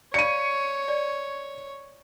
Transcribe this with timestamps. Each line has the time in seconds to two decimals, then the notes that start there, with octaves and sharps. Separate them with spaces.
0.14 C#5 D5 F5 B5 C#7 D#7
0.88 D5